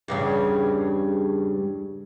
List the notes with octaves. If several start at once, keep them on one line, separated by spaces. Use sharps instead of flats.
E2 G2 C#3